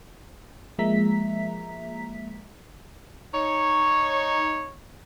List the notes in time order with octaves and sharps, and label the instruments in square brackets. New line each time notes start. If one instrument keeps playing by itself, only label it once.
[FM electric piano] F3 G#3 A#3 E5 A#5 B6
[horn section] D#4 C#5